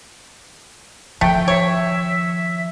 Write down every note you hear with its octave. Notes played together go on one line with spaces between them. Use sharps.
D#3 F3 A3 G5
C#5 E5